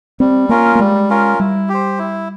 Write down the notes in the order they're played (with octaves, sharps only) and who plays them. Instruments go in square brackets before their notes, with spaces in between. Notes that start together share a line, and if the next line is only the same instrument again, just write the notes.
[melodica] G3 [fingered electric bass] C4
[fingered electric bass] A#3 [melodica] C#4 F4 A#4
[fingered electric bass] A#3
[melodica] G3 [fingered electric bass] G#3
[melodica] C#4 F4 A#4
[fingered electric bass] G3 [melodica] E4
[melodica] G4
C5
E4